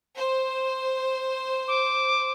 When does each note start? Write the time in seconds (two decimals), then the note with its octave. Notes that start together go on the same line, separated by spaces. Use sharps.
0.17 C5
1.68 D6